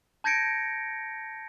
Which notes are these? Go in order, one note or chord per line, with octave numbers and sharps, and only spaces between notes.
A5 G6 G#6 A#6 C#7 D7